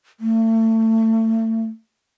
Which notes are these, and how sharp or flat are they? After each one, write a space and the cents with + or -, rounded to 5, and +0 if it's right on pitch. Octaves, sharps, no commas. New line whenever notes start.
A3 +30